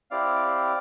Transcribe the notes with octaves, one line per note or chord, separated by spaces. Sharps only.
C4 E4 G4 D5 F5